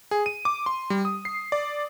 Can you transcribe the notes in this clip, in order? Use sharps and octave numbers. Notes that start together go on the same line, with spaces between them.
G#4
D#7
D6
C6
G3
D#6
C7
D5